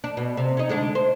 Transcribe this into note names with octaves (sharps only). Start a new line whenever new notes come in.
D4
B2
C3
C#4 D#4
D2 G#3 D4
C5